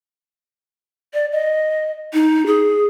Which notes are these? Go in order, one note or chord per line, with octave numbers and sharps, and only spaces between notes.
D5
D#5
D#4
G#4